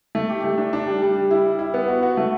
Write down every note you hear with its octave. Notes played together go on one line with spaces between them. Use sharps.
A3
G4
A3
D4
D4
G3
G3
G3
E4
G3
E4
B3
F#4
F#4
A3